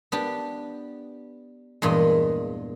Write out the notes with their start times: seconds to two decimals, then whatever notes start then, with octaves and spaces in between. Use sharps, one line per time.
0.12 B3 D4 G4
1.82 E2 G2 A#2 G#3 D#5